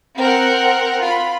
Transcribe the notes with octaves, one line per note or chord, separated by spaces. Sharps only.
C4 A#4 F#5
F4 B5